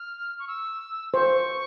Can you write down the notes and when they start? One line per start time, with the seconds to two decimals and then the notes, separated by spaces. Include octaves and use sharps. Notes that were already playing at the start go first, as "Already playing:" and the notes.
Already playing: F6
0.39 C#6
0.48 E6
1.14 C5 C#6